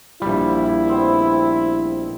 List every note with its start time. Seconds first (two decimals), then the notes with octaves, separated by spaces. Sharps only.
0.22 A#1 G3 E4
0.88 B3 C4 D#5